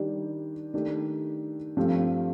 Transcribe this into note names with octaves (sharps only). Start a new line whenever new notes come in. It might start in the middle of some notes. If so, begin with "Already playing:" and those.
Already playing: D#3 G3 D4 G4
D#3 A3 D4 G4
G2 F3 A3 C4 G4